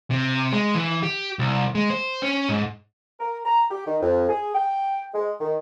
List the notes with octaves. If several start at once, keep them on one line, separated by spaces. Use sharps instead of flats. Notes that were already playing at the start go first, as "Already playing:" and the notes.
C3
G#3
E3
G4
C2
G#3
C5
C#4
G#2
A#4
A#5
G4
D#3
F2
G#4
G5
G#3
D#3